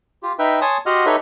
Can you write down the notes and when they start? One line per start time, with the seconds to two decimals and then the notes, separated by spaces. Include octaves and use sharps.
0.23 F4 G4
0.39 D#4 B4 E5 G5
0.61 C#5 G#5 A5 C6 D#6
0.86 F#4 G4 D#5 F#5 C6 F6
1.06 D#4 G4 A4 B4 C#5 E5